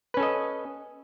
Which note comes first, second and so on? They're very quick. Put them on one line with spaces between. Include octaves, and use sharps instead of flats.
B4 C#4 A4 D#5